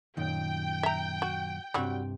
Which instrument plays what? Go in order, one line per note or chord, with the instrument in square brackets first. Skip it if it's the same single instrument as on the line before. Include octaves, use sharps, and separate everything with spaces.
[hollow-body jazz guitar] F#2 A#2 D#3 [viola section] G5
[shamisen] E5 A#5
F#4
[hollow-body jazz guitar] C2 G2 C3 [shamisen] F#3 G3 F#4